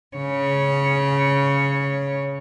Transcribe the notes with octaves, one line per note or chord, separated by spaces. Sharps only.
C#3 C#5